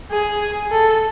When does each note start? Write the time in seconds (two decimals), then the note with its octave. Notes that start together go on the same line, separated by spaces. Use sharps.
0.11 G#4
0.71 A4